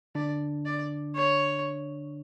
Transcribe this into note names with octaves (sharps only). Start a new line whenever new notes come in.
D3 D4 D5
D5
C#5